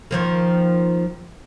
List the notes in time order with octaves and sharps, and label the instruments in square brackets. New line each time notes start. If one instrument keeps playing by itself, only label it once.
[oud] D#3 F3 A#3